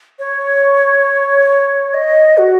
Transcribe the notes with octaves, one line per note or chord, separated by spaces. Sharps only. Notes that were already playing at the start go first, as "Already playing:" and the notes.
C#5
D#5
F#4